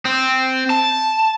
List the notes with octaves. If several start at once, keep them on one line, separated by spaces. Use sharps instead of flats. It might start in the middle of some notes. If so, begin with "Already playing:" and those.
C4
A5